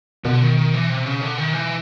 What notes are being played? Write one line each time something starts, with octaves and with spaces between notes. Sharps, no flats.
B2 D3
D#3
D#3
E3
C3
C#3
D3
D#3
E3